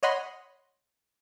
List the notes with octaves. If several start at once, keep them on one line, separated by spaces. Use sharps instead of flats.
C#5 D#5 F#5 B5 C6